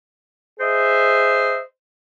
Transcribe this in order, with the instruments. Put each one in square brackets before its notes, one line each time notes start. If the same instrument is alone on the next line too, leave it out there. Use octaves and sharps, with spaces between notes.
[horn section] G#4 C5 D#5 E5